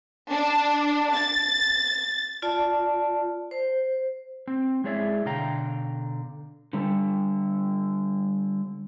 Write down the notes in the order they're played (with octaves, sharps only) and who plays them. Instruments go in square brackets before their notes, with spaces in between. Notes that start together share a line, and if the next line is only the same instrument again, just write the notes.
[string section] D4
A6
[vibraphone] F4 D5 A5
C5
[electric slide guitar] C4
G#3 E4 G#4 C#5 D5 E5
B2 D3 F5 G5 A#5
D3 G3 A4